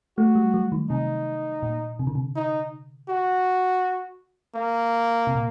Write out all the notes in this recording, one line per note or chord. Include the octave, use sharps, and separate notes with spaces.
A3 F#4
G3
F#3
D#3
C3 D#4
A#2
C3
D3
C3
D#4
F#4
A#3
C3
A#2